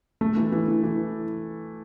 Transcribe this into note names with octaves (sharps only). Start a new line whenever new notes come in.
A3
E3
E3
E3
E3